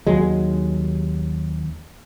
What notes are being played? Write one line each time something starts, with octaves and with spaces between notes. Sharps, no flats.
D#2 F#3 G#3